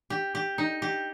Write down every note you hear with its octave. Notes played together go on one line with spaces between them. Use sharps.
G4
G4
D#4
G4